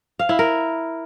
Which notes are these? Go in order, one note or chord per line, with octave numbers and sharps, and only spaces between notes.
F5
E4
A#4